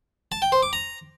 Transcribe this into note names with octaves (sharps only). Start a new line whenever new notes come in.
A5
G5
C5
D6
A#5